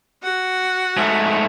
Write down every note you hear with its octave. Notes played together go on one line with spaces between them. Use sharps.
F#4 F#5
G#2 A3